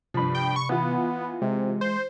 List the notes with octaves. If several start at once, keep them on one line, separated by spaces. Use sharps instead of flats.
G2 C3 F3 B5
G5
C#6
E3 B3 F4
C3 G#3
C5